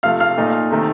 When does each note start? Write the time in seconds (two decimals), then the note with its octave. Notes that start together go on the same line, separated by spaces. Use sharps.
0.03 C3 F3 A3 F5 F6
0.20 F5 F6
0.37 A#2 A3 D#4
0.71 C3 D#3 A3